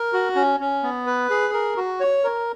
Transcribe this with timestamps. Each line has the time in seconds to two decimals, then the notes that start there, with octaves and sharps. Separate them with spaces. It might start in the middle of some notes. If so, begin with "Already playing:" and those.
Already playing: A#4
0.13 F#4
0.36 C#4
0.60 C#4
0.83 B3
1.06 B4
1.30 G#4
1.53 A#4
1.77 F#4
2.00 C#5
2.24 A#4